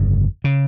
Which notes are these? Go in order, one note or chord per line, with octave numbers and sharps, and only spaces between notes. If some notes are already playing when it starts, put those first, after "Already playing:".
Already playing: G1 F2 C#3
C#3